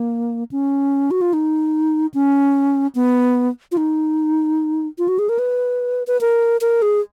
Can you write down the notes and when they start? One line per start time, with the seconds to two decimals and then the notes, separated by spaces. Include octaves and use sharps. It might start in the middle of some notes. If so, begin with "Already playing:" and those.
Already playing: A#3
0.51 C#4
1.11 F#4
1.21 F4
1.33 D#4
2.14 C#4
2.95 B3
3.72 F4
3.77 D#4
4.99 F4
5.08 F#4
5.19 G#4
5.29 A#4
5.39 B4
6.07 B4
6.21 A#4
6.61 A#4
6.82 G#4